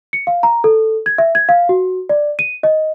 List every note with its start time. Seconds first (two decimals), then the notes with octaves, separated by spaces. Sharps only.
0.13 C#7
0.27 F5
0.43 A#5
0.64 A4
1.06 G#6
1.18 E5
1.35 G#6
1.49 F5
1.69 F#4
2.09 D5
2.39 D#7
2.63 D#5